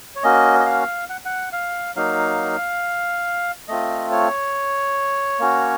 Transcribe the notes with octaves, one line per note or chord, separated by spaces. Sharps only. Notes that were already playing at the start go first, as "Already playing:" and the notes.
C#5
A#3 C#4 F#4 D#5
D#5
F5
F#5
F#5
F5
F#3 A#3 D#4 F5
A3 C4 F4 D#5
C#5
A#3 C#4 F#4